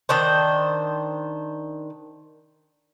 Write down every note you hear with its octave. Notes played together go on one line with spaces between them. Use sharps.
D#3 D4 C5